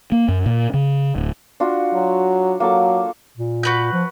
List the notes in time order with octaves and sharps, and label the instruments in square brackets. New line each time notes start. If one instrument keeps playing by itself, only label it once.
[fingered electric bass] A#3
F#2
A#2
C#3
D1
[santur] D4 F4 F#4
[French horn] F#3
[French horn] F#3 [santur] A#3 A4 D6
[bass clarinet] A#2
[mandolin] F#4 B4 G6
[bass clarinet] F3